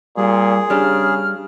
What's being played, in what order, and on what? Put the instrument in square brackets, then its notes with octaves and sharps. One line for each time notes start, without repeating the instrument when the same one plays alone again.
[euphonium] A#2 [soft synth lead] G3 [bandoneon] G#4
[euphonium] C#3 [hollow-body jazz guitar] G3 D4 [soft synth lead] F6